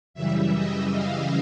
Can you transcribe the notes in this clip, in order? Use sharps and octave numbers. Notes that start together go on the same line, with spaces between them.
F#2 C#3 E3 G3 E5
D#5
F5